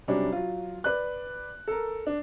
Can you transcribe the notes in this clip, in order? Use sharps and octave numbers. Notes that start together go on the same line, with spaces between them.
C3 F#3 G3 C#4 D4
F#3 F4
B4 D5 F#6
A4 A#4
D4